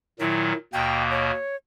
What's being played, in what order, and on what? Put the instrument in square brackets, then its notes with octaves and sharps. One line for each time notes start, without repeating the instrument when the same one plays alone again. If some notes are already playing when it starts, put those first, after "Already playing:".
[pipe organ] A#2 D#3 F#3 [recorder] E4
[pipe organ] D#2 B2 A#3 [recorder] G5
[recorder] C#5